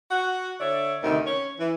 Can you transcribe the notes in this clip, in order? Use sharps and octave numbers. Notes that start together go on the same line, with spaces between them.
F#4 F#5
D3 C#5 D5 E5
D2 C3 D#3
C#4 C#5
E3